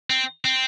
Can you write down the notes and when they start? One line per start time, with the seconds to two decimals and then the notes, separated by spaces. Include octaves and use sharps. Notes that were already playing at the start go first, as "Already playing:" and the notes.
0.10 C4
0.45 C4